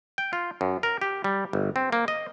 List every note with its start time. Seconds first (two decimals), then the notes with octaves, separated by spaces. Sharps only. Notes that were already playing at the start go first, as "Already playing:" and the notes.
0.18 G5
0.33 F4
0.61 F#2
0.83 A#4
1.02 G4
1.24 G3
1.53 G1
1.76 C4
1.92 A#3
2.08 D#5